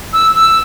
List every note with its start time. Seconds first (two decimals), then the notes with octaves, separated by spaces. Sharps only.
0.13 E6
0.36 E6